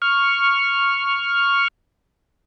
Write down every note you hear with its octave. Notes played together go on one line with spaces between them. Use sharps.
C#6 F6